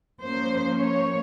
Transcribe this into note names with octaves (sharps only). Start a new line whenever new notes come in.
F3 A#3 C#4 C5
C#5